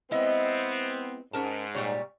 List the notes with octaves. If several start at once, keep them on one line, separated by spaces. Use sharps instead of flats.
G#3 B3 C4 E4 D#5
G#2 C#4 A#4 A5
A#2 G3 C#5